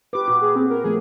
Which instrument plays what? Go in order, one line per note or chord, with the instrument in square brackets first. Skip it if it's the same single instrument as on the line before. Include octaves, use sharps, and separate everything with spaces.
[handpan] G4 B4 [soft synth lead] D6
[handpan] A#2 F#4
[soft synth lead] G#4
C4
A#4
[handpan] F3 A3 B3 [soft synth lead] G#4